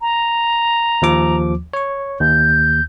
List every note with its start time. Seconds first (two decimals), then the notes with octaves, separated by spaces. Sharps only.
0.01 A#5
1.02 D#2 F3 D6
1.73 C#5 C#6
2.21 D#2 G6